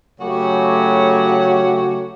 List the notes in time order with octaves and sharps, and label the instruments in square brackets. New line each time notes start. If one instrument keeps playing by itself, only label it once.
[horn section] C#3 F#3 A3 F#4 G4 C#5